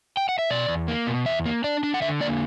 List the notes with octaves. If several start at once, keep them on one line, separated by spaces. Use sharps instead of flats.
G5
F#5
E5
B2 D5
E2
A#3
B2
E2 E5
A#3
D4 D5
D4
F#5
D3 E5
A#3 D5